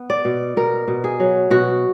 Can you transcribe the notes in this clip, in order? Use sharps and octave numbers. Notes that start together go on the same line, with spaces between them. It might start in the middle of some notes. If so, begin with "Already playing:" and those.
Already playing: B3
D5
B2
B2 A#4
B2
G#4
F#3
B2 F#4